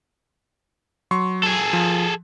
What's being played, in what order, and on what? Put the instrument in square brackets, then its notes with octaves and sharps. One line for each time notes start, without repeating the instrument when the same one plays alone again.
[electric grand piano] F#3 C6 C#6
[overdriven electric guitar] G#4 A4
[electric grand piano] F3